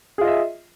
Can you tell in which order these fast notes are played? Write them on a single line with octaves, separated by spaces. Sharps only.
G#4 F4 D#5 E5